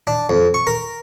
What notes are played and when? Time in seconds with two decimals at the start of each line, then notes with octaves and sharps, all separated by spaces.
0.07 D4
0.29 F2
0.54 C#6
0.67 A#4